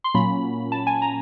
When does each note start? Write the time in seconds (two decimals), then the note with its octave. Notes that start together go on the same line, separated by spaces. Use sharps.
0.04 C6
0.14 A#2 F#3 A#3 C#4 B5
0.72 A5
0.87 G#5
1.02 A#5